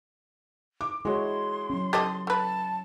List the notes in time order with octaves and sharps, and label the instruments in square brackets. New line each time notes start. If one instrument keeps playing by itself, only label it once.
[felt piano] D6
[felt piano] G#3 F#4 [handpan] E4 C#5 [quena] C6
[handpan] F#3 C#4
[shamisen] G4 A4 D#5 [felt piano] A6
[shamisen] A3 B4 [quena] A5